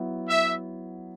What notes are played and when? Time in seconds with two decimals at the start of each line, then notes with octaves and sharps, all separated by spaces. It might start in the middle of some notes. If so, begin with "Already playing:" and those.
Already playing: F#3 B3 E4
0.29 E5